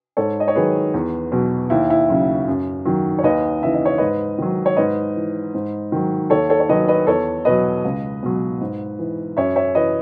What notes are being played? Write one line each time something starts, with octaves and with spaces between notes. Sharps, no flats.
G#2 A4 C#5
D#5
C#5
D#3 F#3 G#4 B4
E2
B2 F#3
D#2 E4
E4
C#3 F#3
F#2
D#3 F#3
C#5
D#2 B4 D#5
C#3 E3 E5
D#5
C#5
G#2 B4 D#5
D#3 F#3
C#5
G#2 B4 D#5
E3
G#2
D#3 F#3
D#2 A4 C#5
A4 C#5
C#5
D#3 F#3 B4 D#5
B4 D#5
E2 A4 C#5
B2 F#3 B4 D#5
C#2
B2 F#3
G#2
E3
F#2 C#5 E5
C#5 E5
E3 B4 D#5